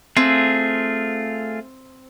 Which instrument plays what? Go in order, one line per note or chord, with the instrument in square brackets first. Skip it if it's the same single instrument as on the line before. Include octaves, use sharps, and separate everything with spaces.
[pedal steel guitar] A3 F4 G#4 [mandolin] C4